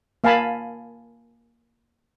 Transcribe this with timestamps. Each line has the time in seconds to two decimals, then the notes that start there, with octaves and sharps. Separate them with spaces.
0.24 A#3 F5 G#5 A5 B5